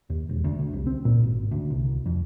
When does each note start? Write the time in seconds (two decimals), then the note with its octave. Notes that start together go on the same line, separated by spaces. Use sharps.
0.10 D#2
0.29 E1
0.44 D2
0.59 D2
0.73 C2
0.87 C4
1.05 A#2
1.23 G#1
1.51 D2
1.70 C2
2.06 F2